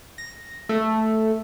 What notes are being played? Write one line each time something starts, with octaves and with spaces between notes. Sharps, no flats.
A#6
A3